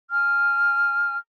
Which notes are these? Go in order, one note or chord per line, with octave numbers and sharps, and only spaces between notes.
G#5 F6